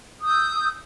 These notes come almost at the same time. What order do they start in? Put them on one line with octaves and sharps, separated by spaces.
D#6 E6 G6